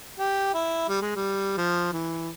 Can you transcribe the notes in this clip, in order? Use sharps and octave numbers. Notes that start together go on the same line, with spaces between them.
G4
E4
G3
G#3
G3
F3
E3